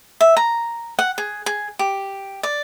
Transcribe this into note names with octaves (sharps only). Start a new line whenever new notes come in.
E5
A#5
F#5
G#4
G#4
G4
D5